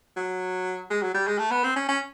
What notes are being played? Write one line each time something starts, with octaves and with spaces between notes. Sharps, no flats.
F#3
G#3
F#3
G3
G#3
A3
B3
C4
C#4
C#4